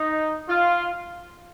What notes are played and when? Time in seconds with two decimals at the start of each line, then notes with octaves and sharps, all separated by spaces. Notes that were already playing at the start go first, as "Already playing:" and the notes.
Already playing: D#4
0.49 F4